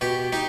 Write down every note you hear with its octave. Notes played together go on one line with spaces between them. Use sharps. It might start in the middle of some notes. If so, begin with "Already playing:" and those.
B2 G4
D#4 G4